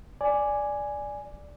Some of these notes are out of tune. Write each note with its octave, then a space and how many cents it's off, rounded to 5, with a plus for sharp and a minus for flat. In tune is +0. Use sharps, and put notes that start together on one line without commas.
D5 +0 G#5 +0